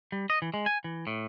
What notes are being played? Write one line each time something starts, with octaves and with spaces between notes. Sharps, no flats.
G3
D#5
E3
G#3
G#5
E3
A2